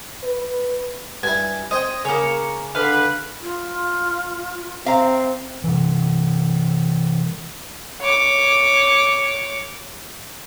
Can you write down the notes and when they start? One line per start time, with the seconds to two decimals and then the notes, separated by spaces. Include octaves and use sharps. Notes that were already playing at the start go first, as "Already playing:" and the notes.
0.23 B4
1.23 G2 E4 G#5
1.71 C4 C#5 D#5 G5
2.05 C#3 A#3 C#5
2.75 D3 B4 F5
3.41 F4
4.86 C4 E5 F5 A#5
5.64 C3 E3
8.02 C#5 D6